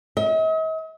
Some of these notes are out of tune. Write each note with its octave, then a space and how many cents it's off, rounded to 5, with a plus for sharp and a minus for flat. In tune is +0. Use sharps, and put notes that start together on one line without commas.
D#5 +45